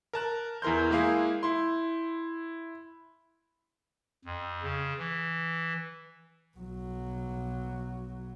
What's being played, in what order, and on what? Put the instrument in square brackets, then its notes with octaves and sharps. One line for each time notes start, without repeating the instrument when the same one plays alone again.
[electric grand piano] A#4 A5 F#6
E2 E4 A#4 C6 G6
G#3 A#3 E4 G#4 F5
E4 C6
[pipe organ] F2
C#3
E3
[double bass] B1 F#3